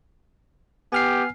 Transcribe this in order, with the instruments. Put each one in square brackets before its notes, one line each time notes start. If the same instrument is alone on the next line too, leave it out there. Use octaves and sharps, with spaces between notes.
[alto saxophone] B3 [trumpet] G4 [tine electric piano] G#5 F6 C7